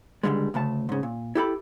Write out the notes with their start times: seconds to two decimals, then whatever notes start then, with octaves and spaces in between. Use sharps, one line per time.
0.23 C#2 G#2 D3 G3 G#3
0.54 D2 C#3 A3 A5
0.89 G#2 C#3
1.03 A#2
1.35 E4 G4 A4 B5